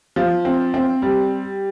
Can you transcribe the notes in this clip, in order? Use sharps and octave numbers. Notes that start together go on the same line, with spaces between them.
F3
C4
C4
G3